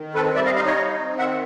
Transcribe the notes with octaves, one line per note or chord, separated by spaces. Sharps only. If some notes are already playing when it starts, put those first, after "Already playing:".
Already playing: D#3
C4 A4 B4
G3 D5 E5
D#5 F5
D#4 D#5 F5
C#5 D#5
D#4
C4
D#3 E5 F#5